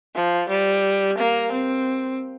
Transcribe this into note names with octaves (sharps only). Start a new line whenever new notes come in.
F3
G3
A#3
C4